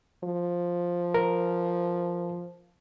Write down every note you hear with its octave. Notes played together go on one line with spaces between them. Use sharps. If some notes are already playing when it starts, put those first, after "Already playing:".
F3
A#4